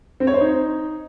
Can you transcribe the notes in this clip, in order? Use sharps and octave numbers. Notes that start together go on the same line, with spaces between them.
C4
C#5
C5
D#4